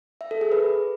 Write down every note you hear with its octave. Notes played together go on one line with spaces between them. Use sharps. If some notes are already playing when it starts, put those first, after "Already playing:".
E5
A4
G#4
B4